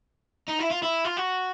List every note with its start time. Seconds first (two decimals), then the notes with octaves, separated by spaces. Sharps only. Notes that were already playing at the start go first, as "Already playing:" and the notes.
0.49 D#4
0.60 E4
0.71 F4
0.83 E4
1.05 F4
1.17 F#4